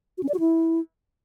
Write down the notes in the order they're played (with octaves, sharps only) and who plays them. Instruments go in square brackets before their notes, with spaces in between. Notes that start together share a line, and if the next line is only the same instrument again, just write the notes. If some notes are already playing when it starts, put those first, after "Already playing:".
[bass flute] F#4
C#4
D5
F#4
E4